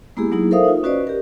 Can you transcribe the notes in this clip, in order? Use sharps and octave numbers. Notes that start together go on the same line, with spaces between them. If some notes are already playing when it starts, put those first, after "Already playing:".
G#3 A#3 B3 E4 G4 G#4
F#3 A#3 D#4 E4 G#4
A4 A#4 C5 E5 F5 D#6
D#4 F4
C#4 F#4 B4 C5 D5 D#5
G4 A#4